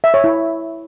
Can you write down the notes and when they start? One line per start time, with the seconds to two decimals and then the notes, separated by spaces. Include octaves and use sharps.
0.04 E5
0.14 C#5
0.24 E4